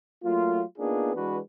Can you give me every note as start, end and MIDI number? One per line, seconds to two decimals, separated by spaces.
0.24 0.61 54
0.24 0.61 57
0.24 0.61 58
0.24 0.61 65
0.78 1.11 58
0.78 1.11 59
0.78 1.11 62
0.78 1.11 63
0.78 1.11 65
0.78 1.11 68
1.15 1.38 52
1.15 1.38 56
1.15 1.38 62
1.15 1.38 66
1.15 1.38 71